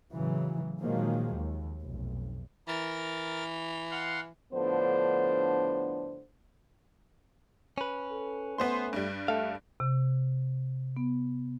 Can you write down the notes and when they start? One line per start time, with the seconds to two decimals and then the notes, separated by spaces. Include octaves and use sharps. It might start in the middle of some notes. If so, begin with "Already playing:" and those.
0.13 A2 C#3 E3 F#3
0.81 A#2 D#3 F3 F#3 G#3 A#3
1.34 D#2
1.80 F1 B1
2.68 E3 A#4 A6
3.91 F5 F#5 C6
4.53 A2 D3 F3 B3 D4 C5
7.78 C#4 B4
8.11 A4
8.58 A3 B3 C5 C6
8.93 G2 G3
9.28 A3 A4 F5
9.80 C3
10.97 B3